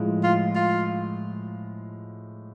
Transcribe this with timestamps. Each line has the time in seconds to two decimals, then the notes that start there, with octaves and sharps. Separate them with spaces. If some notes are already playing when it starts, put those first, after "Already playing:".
Already playing: A2 F3 G#3
0.24 F4
0.55 F4